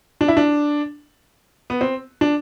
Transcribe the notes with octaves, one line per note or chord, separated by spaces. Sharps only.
D4
E4
D4
B3
C4
D4